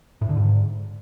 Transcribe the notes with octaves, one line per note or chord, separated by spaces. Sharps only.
A2
D3
G#2